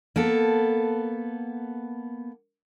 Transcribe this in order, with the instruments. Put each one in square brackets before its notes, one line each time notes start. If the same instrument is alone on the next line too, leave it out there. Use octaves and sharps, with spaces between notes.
[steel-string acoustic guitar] A#3 B3 A4